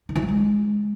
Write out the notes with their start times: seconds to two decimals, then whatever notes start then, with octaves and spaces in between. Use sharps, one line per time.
0.09 D#3
0.16 E3
0.22 G3
0.28 G#3